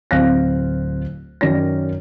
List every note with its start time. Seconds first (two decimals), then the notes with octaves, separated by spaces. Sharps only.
0.11 D1 C4 F5 F#6 A#6
1.41 F#2 D#3 C#4 C#5 D5 A#6